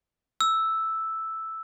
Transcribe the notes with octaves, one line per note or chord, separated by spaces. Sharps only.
E6